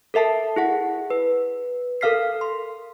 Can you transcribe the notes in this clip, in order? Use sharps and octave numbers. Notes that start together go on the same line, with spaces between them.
A4 A#4 E5 A5 C7
E4 G#4 F#5
B4
A4 A#4 F5 F6 B6 C7
C6